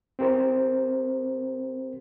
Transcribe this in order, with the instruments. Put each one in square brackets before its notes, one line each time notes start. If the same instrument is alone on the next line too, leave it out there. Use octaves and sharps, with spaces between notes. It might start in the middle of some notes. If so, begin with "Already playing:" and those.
[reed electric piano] C4 G4 A#4 C5